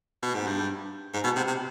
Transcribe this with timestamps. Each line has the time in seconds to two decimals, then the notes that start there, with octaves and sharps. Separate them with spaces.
0.23 B2
0.34 G#2
0.47 G2
1.14 G#2
1.24 B2
1.36 C3
1.48 C3